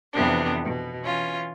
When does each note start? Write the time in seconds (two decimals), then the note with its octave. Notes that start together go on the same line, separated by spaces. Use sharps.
0.13 F2 C3 E3 B3 C4 D4
0.64 B2
1.02 E3 C#4 F4